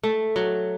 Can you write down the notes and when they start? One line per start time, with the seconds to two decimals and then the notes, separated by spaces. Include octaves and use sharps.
0.03 A3
0.36 F#3